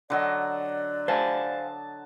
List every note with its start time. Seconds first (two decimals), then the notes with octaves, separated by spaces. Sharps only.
0.10 D3 F#3 D5 D#5
1.08 C5 F5 G#5 A5